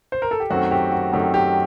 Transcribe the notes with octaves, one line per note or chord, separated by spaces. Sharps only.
C5
A#4
A4
G4
F#2 D#3 A3 C4 F#4
G4
F#4
F#2 D#3 A3 C4 G4
G4